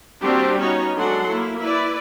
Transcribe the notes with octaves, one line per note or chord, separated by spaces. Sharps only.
G3 A#3 C4 D4 F#4 G4
B3 C#4 D#4 F#4 C#5
F#3 G#3 D4 A4 F#5 C6
A#3 E4
E4 B4 D5